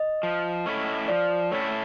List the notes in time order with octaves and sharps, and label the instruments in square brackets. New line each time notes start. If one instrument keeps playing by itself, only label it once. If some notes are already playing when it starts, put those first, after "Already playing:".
Already playing: [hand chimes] D#5
[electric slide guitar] F3
A3 C#4 E4 A4
[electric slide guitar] F3 [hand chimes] D5
[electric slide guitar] A3 C#4 E4 A4 [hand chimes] C#5